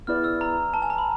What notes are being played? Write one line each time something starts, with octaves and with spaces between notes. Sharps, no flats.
B3 E4 G#4 B4 D5 F6
E6
A#5
A5
G#5
A#5
B5